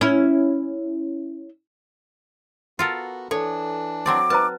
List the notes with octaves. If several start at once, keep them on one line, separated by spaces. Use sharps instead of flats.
C#4 E4
B3 F4 F#4 A4 A#4
E3 D4 A4 C#5
F#3 C4 D5 D6
D#4 B4 C5 A5 A#5